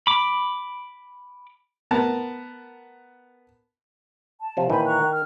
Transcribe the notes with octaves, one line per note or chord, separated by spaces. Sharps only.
B5 D6
B3 A#4 A5
A5
C3 F3
A#2 D#3 E3 C5 G#5 B5
A#5 C#6 F#6
D#3
F6